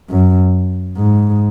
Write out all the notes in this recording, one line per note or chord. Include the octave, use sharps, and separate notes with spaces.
F#2
G#2